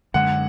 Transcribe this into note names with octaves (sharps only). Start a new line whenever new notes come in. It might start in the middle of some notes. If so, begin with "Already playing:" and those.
F#2 D3 G#3 F#5